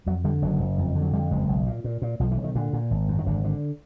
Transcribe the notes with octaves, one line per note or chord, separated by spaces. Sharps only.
F2 F#3
D3 G3
F#1 F#3
F#1
F2
D3
F#3
F2 G3
F#1 G#3
B1
A#2
A#2
A#2
B1 F3
E3
B1
D#3
A#2 D3
A#2
G#1
F#2
D#3
G#1 D3
D3